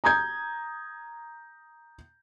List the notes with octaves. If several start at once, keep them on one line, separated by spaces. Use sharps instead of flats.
A#5 D#6 G6 G#6